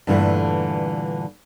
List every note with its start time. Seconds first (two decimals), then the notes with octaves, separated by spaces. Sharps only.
0.07 G2 A#2 D3 E3 A3